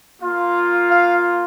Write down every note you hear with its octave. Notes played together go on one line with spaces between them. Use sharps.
A#3 F4
F5